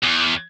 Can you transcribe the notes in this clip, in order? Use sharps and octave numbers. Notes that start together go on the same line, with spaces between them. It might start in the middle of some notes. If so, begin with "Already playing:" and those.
E2